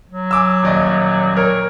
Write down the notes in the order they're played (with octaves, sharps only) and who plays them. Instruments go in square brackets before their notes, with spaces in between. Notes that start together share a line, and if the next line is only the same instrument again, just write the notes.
[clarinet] F#3
[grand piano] G#5 D6 E6
D#1 D5 D#5
[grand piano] A#4 [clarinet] C#5